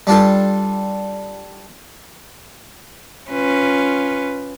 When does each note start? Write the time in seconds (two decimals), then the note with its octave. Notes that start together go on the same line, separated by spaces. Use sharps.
0.07 G3 D4 F4 A4
3.31 C#4 F4 B4